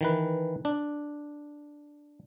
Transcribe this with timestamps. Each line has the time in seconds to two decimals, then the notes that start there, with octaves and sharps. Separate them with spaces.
0.01 D#3 E3 B4
0.65 D4